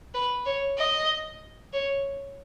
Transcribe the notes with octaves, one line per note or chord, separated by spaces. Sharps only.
B4
C#5
D#5
C#5